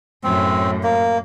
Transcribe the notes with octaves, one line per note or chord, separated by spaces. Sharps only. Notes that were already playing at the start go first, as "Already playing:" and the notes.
F#2 A2 C4
A#3